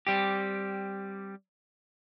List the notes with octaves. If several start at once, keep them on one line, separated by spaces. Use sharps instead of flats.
G3 C4 G4